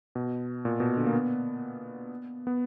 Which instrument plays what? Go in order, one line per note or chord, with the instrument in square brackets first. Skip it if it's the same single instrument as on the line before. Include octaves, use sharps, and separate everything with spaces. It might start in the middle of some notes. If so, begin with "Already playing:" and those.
[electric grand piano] B2
A#2
B2
D3
A#3
B3
B3